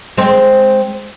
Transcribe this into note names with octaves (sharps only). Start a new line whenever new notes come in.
G#3 C4